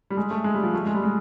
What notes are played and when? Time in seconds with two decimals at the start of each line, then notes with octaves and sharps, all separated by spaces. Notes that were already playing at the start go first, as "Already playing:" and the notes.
0.10 G3
0.17 G#3
0.31 A3
0.44 G#3
0.54 G3
0.63 F3
0.74 A3
0.86 G#3
0.94 G3
1.03 G#3